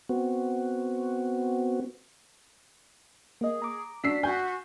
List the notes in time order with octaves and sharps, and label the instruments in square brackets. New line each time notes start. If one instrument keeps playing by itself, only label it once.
[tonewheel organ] B3 C4 F#4
[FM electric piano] A#3 D#5 [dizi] G#4
[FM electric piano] A#5 D6
[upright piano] D4 E6 C7 [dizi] F#4 [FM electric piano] B6
[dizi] F#4 [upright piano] G#5 G6